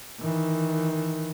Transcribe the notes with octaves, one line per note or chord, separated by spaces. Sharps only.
D#3 E3